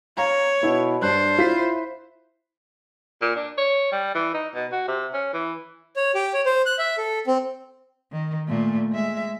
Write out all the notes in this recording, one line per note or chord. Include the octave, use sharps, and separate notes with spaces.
C#5 F5 A#5
B2 E4
G2 D4 C5 F#6
E4 F4 E5 B6
A#2
D4
C#5
G3
E3
D#4
B2
F#4
C3
C#4
E3
C#5
G4
C#5
C5
F#6
E5
A4
C4
D#3
A#2 A3
G#3 E5